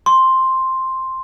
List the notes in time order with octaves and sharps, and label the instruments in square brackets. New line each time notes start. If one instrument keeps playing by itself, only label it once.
[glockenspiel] C6